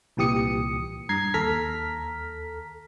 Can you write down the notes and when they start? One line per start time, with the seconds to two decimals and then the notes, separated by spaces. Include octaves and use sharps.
0.17 C2 A#2 E3 G4 D#6 C#7
1.09 G2 A#5 G#6 C7
1.34 D#2 A4 A#5 F6 B6